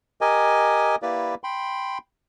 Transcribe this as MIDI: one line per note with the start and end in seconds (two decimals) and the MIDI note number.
0.21 0.96 67
0.21 0.96 70
0.21 0.96 75
0.21 0.96 80
1.02 1.35 58
1.02 1.35 64
1.02 1.35 67
1.02 1.35 71
1.02 1.35 74
1.44 1.98 79
1.44 1.98 83
1.44 1.98 84